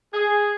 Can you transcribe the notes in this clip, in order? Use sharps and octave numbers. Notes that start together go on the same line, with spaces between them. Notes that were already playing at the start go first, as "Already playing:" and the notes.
G#4